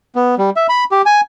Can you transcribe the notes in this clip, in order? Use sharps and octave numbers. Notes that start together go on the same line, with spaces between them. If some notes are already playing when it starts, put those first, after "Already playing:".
B3
G3
E5
B5
G4
G#5